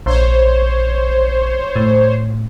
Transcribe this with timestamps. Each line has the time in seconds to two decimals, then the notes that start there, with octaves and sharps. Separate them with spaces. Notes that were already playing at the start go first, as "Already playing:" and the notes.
0.06 A#1 C5 C#5
1.76 A2